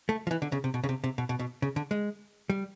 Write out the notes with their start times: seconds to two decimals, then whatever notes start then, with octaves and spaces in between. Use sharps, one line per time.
0.09 A3
0.27 F3
0.31 E3
0.42 D3
0.52 C#3
0.64 C3
0.74 B2
0.84 C#3
0.89 C3
1.04 C3
1.18 B2
1.29 B2
1.39 B2
1.62 C#3
1.76 D3
1.91 G#3
2.50 G3